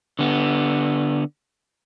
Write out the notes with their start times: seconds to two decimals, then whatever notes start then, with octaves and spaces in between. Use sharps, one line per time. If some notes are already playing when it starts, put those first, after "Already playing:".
0.19 D3 B3